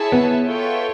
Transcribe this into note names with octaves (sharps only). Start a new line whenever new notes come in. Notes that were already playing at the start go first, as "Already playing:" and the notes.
Already playing: E4 G#4 C#5 E5 A5
B3
F4 A4 C#5 E5 G5